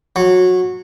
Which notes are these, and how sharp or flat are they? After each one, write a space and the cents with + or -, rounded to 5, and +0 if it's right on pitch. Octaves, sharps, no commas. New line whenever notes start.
F#3 -20